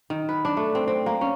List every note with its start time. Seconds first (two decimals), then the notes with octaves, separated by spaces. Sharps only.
0.10 D#3
0.29 B4
0.45 D4
0.57 A3
0.75 C4
0.88 C4
1.06 A#3
1.21 C#4